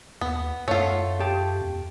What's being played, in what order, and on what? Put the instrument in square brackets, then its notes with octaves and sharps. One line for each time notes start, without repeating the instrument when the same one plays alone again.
[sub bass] D#2 [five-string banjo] B3
[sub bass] F#2 [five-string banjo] A3 F4 [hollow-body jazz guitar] C#5 F#5
[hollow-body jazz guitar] G4 A5
[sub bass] E2